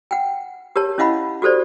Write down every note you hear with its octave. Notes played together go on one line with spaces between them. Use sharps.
F#5 G5
G4 A#4 C#5 A5
C#4 E4 D#5 F5 F#5 B5
F#4 G4 A4 C5 D5